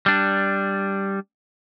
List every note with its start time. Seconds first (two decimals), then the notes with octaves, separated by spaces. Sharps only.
0.06 G3 D4